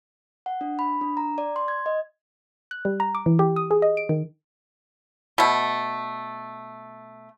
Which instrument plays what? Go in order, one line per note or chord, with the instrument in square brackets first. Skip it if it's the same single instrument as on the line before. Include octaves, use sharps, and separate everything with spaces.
[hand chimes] F#5
D4
B5
D4
A#5
D5
C6
G#6
D#5
[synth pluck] F#6
G3
A#5
D6
E3
G4
D#6
G#4
D#5
D7
D#3
[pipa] B2 A3